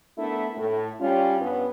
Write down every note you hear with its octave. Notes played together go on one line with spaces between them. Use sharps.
A3 B3 D4 E4 A#4
A2
G3 C#4 F4
G2 B3 C#4 B4